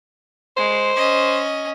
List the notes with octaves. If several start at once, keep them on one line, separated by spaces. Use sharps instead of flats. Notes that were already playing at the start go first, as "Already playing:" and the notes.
G#3 C5
C#4 D#5